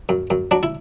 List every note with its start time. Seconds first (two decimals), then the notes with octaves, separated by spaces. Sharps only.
0.09 F#2
0.30 F#2
0.51 F#3 D4
0.63 E4